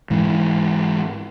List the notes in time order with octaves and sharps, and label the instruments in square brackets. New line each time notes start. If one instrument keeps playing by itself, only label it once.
[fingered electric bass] G#2 E3